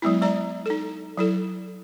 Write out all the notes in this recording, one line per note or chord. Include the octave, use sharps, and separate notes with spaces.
F#3 G#3 B3 E4
G#3 D5 A#5
D#4 A4
F#3 E4 A4